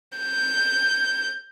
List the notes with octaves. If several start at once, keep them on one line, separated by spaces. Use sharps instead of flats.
G6